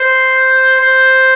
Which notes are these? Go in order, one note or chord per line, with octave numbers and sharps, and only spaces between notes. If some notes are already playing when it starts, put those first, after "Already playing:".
Already playing: C5
C5